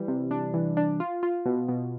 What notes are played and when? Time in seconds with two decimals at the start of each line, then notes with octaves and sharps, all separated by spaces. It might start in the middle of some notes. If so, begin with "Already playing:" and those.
Already playing: E3 G3
0.08 C3
0.31 D4
0.54 E3
0.77 D4
1.00 F4
1.23 F4
1.46 B2
1.68 B2